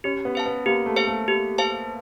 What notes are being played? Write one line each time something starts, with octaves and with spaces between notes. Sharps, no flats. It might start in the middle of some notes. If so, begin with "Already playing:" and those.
C#4 G4
B3
C5 F5 A5
B3
A#3 G4
A3
C5 F5 A5
A3
G4
C5 F5 A5